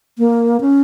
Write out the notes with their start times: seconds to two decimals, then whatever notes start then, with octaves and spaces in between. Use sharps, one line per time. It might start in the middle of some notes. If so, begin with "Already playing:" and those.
0.18 A#3
0.61 C#4